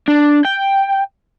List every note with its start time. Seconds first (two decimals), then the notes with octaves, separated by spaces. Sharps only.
0.08 D4
0.45 G5